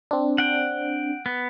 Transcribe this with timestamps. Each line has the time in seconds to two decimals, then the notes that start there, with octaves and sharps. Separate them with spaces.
0.11 C4 D4
0.38 F#5 G5
1.26 B3